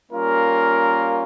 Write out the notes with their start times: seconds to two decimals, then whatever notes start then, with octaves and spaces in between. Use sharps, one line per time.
0.11 G3 A#3 C#4 F4 A#4